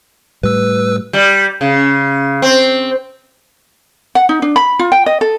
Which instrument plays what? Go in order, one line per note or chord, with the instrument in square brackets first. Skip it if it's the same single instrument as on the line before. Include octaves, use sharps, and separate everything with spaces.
[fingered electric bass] A2 G3 [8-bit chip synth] B4 E6
[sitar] G3
C#3
C4
[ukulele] F#5
D#4
D4
B5
F4
G5
D#5
A4